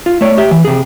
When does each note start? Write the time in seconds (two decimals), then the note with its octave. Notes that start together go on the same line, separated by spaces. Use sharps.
0.06 F4
0.21 A3 C#5 D5
0.38 G4 E5
0.51 E3
0.65 C3 G#4